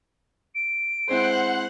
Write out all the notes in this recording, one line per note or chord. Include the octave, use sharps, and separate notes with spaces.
D7
G#3 C4 E4 C5 F#5 F#6